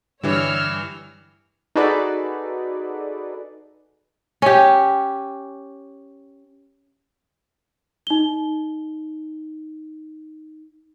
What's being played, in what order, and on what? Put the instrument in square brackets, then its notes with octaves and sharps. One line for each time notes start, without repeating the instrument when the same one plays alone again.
[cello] G2 [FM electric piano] D3 [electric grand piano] E3 G3 [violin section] C#5 E6 F6
[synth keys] D#4 F#4 G#4 A4 B4 D5
[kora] C#4 G4
[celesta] D#4 G7